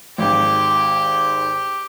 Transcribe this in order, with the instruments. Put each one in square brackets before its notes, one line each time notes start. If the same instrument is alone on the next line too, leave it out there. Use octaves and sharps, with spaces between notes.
[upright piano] G#1 G#2 [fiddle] G4